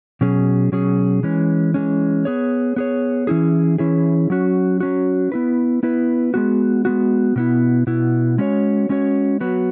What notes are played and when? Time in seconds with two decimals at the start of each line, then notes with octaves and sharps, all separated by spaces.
0.21 B2 F#3 C#4 G#4
0.72 B2 F#3 C#4 G#4
1.23 E3 G#3 C#4
1.74 E3 G#3 C#4
2.25 B3 G#4 C#5
2.76 B3 G#4 C#5
3.27 E3 C#4 E4 G#4
3.78 E3 C#4 E4 G#4
4.30 F#3 C#4 F#4
4.80 F#3 C#4 F#4
5.32 B3 E4 B4
5.83 B3 E4 B4
6.34 G#3 B3 F#4
6.85 G#3 B3 F#4
7.36 B2 B3 E4
7.87 B2 B3 E4
8.38 G#3 C#4 F#4 C#5
8.89 G#3 C#4 F#4 C#5
9.40 F#3 B3 F#4 B4